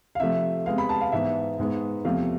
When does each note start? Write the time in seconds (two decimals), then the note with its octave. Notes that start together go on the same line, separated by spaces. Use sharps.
0.15 F5
0.20 C3 F3 A3 E5
0.66 C3 G#3 B3 F5
0.78 B5
0.89 A5
1.01 F5
1.12 G#2 E3 B3 E5
1.59 G#2 G#3 B3
2.05 E2 C3 F3 A3 F5